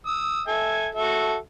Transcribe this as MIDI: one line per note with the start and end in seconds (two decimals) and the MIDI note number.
0.07 0.41 87
0.07 0.41 88
0.48 0.88 69
0.48 0.88 76
0.48 0.88 80
0.95 1.35 66
0.95 1.35 69
0.95 1.35 76